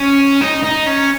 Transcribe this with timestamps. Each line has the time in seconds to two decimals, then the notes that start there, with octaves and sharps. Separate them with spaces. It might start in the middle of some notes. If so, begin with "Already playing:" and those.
Already playing: C#4
0.41 D#4
0.63 D#4
0.86 C#4